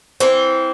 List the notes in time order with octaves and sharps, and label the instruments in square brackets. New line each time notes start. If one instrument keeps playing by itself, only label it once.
[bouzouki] E3 C4